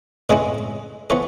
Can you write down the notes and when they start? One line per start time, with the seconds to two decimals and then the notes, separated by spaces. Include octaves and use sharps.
0.30 A2 G#3 C#4 E4 G#4 B4
1.10 E3 B3 A4 C#5